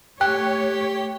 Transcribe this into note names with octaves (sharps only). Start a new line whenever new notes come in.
A3 G4 C#5 G5 F#6